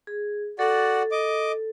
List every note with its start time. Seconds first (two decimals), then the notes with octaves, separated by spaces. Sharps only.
0.07 G#4
0.59 F#4 A4 D5 F#5
1.12 D#5 D6